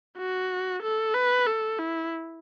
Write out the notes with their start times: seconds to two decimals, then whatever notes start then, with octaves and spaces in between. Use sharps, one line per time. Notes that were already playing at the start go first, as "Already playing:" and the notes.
0.18 F#4
0.83 A4
1.14 B4
1.47 A4
1.79 E4